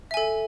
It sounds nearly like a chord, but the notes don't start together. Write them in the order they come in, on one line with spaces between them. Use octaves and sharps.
E5 G#5 A4